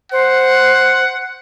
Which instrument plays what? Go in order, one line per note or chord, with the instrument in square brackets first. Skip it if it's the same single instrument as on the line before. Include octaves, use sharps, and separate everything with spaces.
[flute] C5 [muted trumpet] F#5